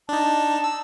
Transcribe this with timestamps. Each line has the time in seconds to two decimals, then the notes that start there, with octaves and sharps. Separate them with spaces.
0.09 D4 D#4 A5
0.64 E6